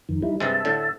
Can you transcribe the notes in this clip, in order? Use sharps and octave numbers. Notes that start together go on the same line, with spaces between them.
F2 D#3
G3 D#4 E4
G2 C3 G#3 E5 A5
A2 D3